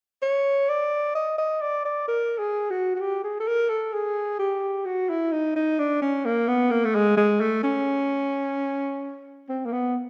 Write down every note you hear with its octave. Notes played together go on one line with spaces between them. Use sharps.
C#5
D5
D#5
D#5
D5
D5
A#4
G#4
F#4
F#4
G4
G#4
A4
A#4
A4
G#4
G4
F#4
E4
D#4
D#4
D4
C#4
A#3
B3
A#3
A3
G#3
G#3
A3
C#4
C4
A#3
B3